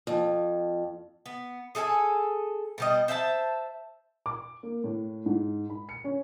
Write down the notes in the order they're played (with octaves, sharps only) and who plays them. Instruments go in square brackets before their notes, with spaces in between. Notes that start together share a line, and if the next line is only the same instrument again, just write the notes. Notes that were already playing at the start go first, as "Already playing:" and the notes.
[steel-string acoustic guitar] F2
[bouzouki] B3
G#4 A4 E5 G#5
B2 G3 D#5
C5 E5 F#5 A5
[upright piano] D6
A#3
A2
G#2
B5
C#7
C#4